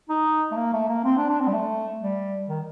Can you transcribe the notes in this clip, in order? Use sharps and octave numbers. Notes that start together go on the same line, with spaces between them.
D#4
A3
A#3
A3
A#3
C4
D4
D4
C4
G3
A3
G3
D#3